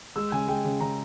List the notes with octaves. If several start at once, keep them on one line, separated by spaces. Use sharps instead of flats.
G#3 E6
C#3 G#5
G#3 G5
C#3
C#3 A#5